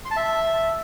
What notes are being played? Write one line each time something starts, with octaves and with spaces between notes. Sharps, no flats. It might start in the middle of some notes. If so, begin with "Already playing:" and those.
C6
A5
E5